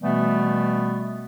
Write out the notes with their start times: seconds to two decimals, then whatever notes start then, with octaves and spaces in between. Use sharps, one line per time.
0.02 B2 E3 G3 A3 B3